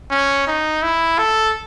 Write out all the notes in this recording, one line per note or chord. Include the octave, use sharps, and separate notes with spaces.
C#4
D#4
E4
A4